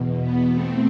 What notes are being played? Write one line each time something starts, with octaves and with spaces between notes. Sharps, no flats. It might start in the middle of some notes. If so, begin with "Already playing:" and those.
Already playing: E2 B2
B3
A3 C4